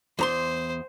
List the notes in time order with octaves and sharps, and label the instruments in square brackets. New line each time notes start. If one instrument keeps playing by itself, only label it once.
[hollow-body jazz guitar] E2 A#5 C6 [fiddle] C5